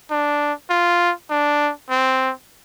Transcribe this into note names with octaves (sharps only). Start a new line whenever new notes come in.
D4
F4
D4
C4